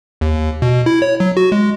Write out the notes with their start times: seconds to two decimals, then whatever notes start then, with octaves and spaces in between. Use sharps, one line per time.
0.21 D#2
0.62 B2
0.86 E4
1.02 C#5
1.20 F#3
1.37 F#4
1.52 G#3